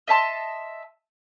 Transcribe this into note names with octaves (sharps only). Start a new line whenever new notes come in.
D#5 E5 A5 C6